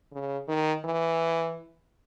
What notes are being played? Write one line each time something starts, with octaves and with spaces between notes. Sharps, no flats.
C#3
D#3
E3